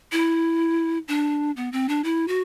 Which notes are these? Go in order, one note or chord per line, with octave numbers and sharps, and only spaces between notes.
E4
D4
B3
C4
D4
E4
F#4